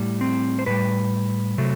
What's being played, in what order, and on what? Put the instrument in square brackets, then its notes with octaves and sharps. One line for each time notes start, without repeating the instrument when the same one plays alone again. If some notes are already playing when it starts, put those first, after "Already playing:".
Already playing: [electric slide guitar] A2 G3
C4
C5
A2 G3 B4
C3 F#3 A3